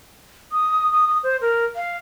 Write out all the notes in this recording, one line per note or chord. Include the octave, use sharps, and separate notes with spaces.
D#6
D#6
D#6
C5
A#4
F5